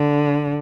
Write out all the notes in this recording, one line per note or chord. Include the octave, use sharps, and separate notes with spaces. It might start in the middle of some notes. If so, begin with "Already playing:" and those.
Already playing: D3